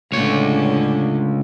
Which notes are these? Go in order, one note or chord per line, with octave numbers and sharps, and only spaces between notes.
C#2 A2 D3 C#4 C#5